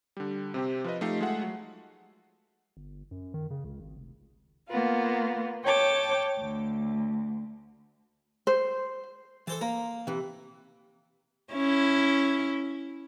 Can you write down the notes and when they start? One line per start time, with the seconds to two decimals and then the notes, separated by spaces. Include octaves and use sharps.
0.17 D3 G3
0.54 C3 C4 G4
0.84 F3 B4 D#5
1.01 F3 A3 D#4 G4 F5 C7
1.21 G#3 A3 F4 E5 F#5
1.42 F#3
2.77 G1
3.11 F#2
3.34 D#3
3.51 C#3
3.64 C#2
3.80 G#1
3.97 F1
4.68 A#3 B3 F4
5.63 C#5 G5 A5 D6
6.38 D2
8.47 C5
9.47 E3 A4 C5 A5
9.61 A#3 A#5
10.07 C3 E3
11.53 C#4 E4